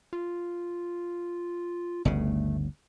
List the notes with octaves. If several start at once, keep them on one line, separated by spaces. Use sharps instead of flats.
F4
G1 D2 C#3 A3